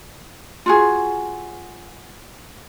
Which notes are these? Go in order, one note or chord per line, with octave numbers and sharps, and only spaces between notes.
F4 F#4 G#4